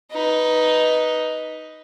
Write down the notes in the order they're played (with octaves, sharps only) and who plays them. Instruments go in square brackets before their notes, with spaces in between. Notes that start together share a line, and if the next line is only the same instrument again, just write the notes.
[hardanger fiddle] D#4 B4